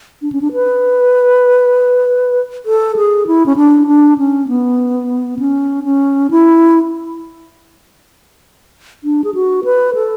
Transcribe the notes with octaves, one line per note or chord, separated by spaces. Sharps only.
D4
C#4
D4
B4
A4
G#4
E4
C#4
D4
D4
C#4
B3
C#4
C#4
E4
D4
G#4
F#4
B4
A4